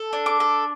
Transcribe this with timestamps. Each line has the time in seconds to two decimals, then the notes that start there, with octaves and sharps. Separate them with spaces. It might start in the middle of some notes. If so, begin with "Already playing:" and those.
Already playing: A4
0.13 D4
0.26 D6
0.40 A4